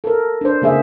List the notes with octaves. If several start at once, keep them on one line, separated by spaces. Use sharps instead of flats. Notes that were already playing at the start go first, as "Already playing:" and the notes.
A4 A#4
D4 C5
C#3 A#3 G#4 E5